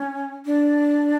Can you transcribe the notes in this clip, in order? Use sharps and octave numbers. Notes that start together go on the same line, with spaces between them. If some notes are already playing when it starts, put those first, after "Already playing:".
Already playing: C#4
D4